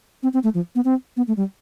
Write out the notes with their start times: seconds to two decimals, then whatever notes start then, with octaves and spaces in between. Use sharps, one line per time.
0.23 C4
0.34 C4
0.44 A3
0.54 F3
0.75 B3
0.85 C4
1.17 B3
1.28 A3
1.37 G3